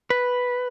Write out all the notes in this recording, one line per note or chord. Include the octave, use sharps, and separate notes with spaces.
B4